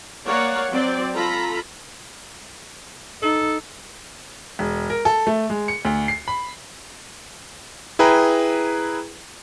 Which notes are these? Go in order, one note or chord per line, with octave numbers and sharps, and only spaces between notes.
A#3 C#5 D5 F5 F#5 A#5
F#3 C4 D5
F4 A4 A#5 B5
D#4 A4
E1
A#4
A4
A3
G#3
C#7
D2
C7
B5
E4 G#4 B4 G5 A#5